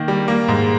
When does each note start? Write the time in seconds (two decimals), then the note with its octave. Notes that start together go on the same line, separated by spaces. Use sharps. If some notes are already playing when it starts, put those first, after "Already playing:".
Already playing: D#3 A#3
0.08 G3
0.28 A#3
0.48 G#2